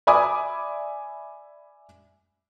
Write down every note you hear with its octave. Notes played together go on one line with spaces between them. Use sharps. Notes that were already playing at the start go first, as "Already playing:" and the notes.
D5 E5 G#5 B5 D6 D#6